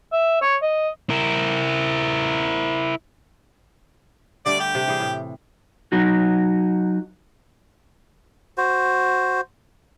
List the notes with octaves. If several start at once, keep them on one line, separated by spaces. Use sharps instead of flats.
E5
C#5
D#5
E4 A#4
D3 G3 A3 D5
G4
C3
E3 G3 G#4
A2
F#3 D#4 F#4
F#4 C5